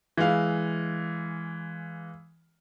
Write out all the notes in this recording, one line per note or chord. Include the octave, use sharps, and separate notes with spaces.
E3 G#3 F5